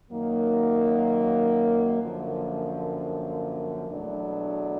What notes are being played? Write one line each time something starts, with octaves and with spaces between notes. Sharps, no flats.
F#2 D#3 F#3 A#3
F#2 D3 F3 A#3
E2 B2 F#3 A3 D4